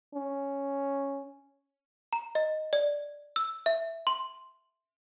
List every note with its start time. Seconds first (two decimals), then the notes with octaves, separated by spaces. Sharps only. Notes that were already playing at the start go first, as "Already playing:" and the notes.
0.14 C#4
2.13 A#5
2.35 D#5
2.73 D5
3.36 E6
3.66 E5
4.07 C6